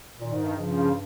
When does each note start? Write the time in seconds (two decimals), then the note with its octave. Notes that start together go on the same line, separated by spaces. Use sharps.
0.19 A#2 D#3
0.32 G#2
0.44 G2
0.56 G2 C#3 F3